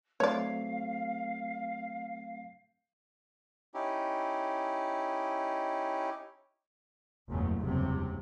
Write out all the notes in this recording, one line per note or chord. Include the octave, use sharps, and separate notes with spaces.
F#3 A3 C4 C#5 D5 F5
C#4 D#4 E4 G4
F#1 E2 A#2 C#3 A3
F#1 E2 G2 C3